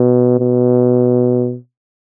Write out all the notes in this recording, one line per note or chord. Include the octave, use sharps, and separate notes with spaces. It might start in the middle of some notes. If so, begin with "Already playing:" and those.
Already playing: B2
B2